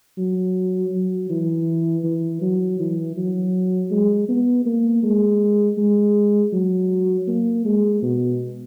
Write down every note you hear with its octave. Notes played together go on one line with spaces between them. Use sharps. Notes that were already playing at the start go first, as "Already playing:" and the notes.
F#3
F#3
E3
E3
F#3
E3
F#3
G#3
B3
A#3
G#3
G#3
F#3
A#3
G#3
B2